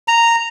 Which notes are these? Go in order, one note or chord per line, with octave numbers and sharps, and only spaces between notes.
A#5